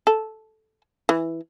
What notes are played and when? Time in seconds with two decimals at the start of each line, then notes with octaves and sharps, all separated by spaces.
0.07 A4
1.09 E3